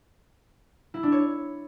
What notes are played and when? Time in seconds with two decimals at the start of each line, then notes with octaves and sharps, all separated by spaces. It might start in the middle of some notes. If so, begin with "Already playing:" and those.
0.94 E4
1.03 D4
1.12 C#5